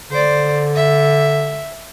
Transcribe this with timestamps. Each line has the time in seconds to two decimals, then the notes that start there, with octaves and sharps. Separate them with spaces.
0.11 D3 C5 D5
0.76 E5